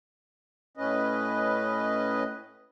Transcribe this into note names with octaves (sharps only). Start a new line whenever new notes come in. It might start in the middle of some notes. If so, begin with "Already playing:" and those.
A2 C#4 B4 D#5